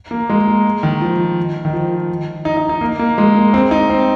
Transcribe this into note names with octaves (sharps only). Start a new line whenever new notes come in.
A#3
G#3
A#3
D#3
F3
D#3
F3
D#4
D#4
D#4
A#3
A#3
G#3
A#3
C4
D#4
C4